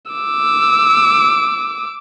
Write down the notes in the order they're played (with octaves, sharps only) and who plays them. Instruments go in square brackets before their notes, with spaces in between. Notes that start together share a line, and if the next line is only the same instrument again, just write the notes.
[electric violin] D6 E6